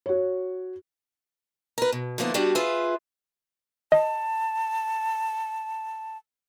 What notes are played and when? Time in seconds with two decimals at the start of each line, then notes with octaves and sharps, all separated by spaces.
0.06 F#4 C#5
1.78 A#4 B4
1.92 B2
2.18 D3 F3 A#3 B3 E4
2.34 G3 B3 D4 F#4 G4
2.55 F4 G#4 B4 E5
3.92 D#5 A5